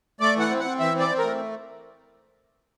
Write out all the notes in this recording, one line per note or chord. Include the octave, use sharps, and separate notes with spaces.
A3 D5
E3 F#5
C4
F#5
C4
E3 E5
C4
D5
C4
A3 A#4